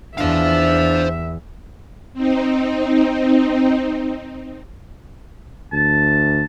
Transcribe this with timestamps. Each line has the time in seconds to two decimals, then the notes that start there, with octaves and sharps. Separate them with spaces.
0.18 E2 D4 C5 E5 F5
2.13 C4 D#4
5.73 D2 A5